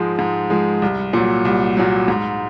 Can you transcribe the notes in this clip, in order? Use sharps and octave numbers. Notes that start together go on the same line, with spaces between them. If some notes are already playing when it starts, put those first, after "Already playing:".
Already playing: G#2 F3 G#3
G#2
F3 G#3
C2
A#2 F#3
C2
A#2 F#3
G#2